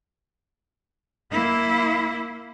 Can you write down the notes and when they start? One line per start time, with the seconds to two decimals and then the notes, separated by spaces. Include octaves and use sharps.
1.31 A#3 E4